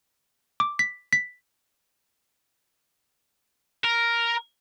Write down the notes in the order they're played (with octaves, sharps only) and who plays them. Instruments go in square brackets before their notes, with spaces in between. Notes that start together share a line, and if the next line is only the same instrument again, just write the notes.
[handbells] D6
B6
B6
[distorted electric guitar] A#4